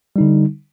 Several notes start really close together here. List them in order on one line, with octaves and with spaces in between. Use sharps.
G3 D#4 D3